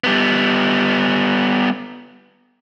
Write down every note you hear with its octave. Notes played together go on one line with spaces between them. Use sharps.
G3 B3